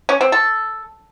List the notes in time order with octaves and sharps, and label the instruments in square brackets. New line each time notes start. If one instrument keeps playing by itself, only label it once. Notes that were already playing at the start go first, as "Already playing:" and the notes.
[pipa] C#4
C4
A4